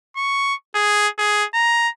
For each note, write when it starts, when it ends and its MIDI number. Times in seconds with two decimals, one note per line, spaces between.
0.16 0.54 85
0.75 1.08 68
1.18 1.44 68
1.54 1.88 82